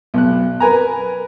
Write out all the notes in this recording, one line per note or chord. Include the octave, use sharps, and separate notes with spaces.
B1 F#6
A#4 B4 G#5 A#5